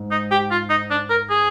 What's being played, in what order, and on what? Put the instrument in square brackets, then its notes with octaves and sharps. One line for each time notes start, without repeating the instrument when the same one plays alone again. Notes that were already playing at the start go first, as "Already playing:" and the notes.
Already playing: [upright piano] G#2
[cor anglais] D#4
G4
F4
D#4
D4
A#4
G#4